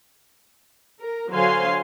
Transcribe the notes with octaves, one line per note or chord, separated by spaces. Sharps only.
A#4
D3 F#3 C5 F5 G#5 C6